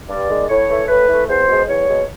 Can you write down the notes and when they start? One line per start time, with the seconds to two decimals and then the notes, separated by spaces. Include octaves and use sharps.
0.08 G2 D5
0.28 D#3 G#3
0.49 A2 C#5
0.68 E3 A3
0.88 A2 B4
1.08 E3 A3
1.28 E2 C5
1.47 B2 G#3
1.68 E2 C#5
1.87 B2 G#3